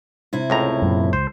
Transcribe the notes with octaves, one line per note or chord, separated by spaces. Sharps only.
C3 E4
C#2 A2 A#5
F#2 A#2
C#2 C5